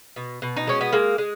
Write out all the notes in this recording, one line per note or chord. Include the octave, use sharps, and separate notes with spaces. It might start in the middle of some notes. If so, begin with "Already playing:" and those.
B2
B2
D#4
G#3 C#4
B3
G#3 A#3
G#3